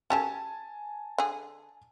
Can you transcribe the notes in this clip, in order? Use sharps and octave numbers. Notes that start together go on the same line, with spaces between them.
C#4 G4 A4 G#5 A5
D3 G#4